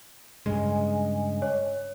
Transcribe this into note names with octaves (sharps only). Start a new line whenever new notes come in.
G2 C#3 G#3 D#5 G#5
C#5